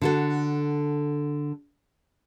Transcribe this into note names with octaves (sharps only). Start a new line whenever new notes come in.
D3 F#4 A4